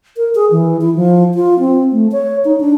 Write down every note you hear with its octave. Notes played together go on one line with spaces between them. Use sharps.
A#4
G#4
E3
E4
F3
F4
C4
A3
C#5
D#4
D4